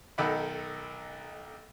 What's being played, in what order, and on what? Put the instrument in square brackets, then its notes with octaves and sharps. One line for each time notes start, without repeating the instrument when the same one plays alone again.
[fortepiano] B1 D#3 D#4 A4 F#5 B5